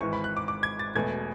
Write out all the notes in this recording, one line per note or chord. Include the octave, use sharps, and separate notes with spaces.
G#1 G#2 E3 C#6
B5
F#6
D6
D6
G#6
A6
E1 E2 B2 A3 G#6